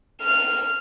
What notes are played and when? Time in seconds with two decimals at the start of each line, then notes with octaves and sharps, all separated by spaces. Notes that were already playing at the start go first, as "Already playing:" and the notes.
0.21 F6